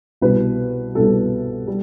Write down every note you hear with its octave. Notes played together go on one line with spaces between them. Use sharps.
C2 B2 G3 B4
C2 B2 G3 A4
G3